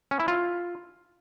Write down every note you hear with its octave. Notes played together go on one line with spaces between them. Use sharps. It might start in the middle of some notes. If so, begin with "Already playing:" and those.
C#4
E4
F4